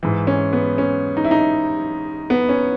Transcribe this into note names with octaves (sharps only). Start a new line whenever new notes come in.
G#2 E3
C#4
B3
C#4
D#4
E4
D#4
B3
C#4